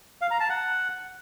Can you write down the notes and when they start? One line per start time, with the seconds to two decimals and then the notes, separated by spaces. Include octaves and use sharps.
0.21 F5
0.31 A#5
0.40 A5
0.49 F#5